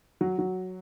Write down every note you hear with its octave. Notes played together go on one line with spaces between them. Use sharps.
F#3
F#3